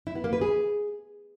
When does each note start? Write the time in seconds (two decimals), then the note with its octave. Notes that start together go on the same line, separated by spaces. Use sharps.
0.07 E4
0.15 B3
0.24 A#3
0.33 B4
0.41 G#4